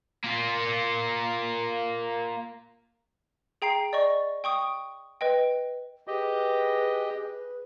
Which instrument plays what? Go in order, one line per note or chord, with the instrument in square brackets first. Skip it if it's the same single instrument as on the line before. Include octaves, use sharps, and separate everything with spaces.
[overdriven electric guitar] A#3 F4
[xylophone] G#4 G5 A#5 C7
D5 D#5 C#6
G5 C#6 D#6
B4 D#5 G5
[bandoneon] G4 D#5 [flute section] G#4 B4